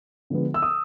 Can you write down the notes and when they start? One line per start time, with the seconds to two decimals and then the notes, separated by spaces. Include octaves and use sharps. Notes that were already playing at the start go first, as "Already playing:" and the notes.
0.30 D3 F3 G#3 B3
0.54 E6
0.62 D#6